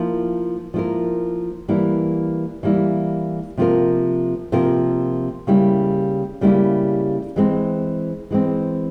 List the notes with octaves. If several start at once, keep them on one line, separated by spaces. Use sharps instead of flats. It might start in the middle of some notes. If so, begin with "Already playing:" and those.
Already playing: F3 A#3 E4 A#4
F3 A#3 E4 A#4
E3 G3 A#3 E4
E3 G3 A#3 E4
C3 F3 A#3 F4 A#4
C3 F3 A#3 F4 A#4
C#3 G3 A#3 E4
C#3 G3 A#3 E4
E3 G#3 C4
E3 G#3 C4